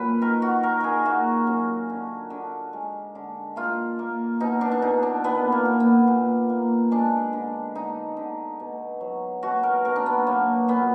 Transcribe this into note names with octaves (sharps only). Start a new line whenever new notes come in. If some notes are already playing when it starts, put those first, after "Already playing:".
Already playing: A#2 F#3 B4
D#3 A#4
F#4
D#3 A#4
G#4 A#4
A#3 F#4
F#2
D3
D3
G#3
D3
A#3 F4
A#3
B2 D#4
D4
D4
B2 D#4
D4
A#2 B3
A#3
A#2
B3
A#2
A#3
G#3 D4
D3
D3 D#4
D3
B2
F#3
B2 F#4
A#4
B2 A#4
D4
B3
F#3 A#3
A#2 B3